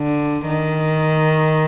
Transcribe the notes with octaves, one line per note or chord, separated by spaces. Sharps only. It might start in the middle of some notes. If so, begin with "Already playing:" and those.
Already playing: D3
D#3